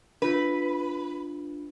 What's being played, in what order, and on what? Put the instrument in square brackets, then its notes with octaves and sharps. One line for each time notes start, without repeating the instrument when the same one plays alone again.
[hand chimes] D4 F4 [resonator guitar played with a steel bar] B4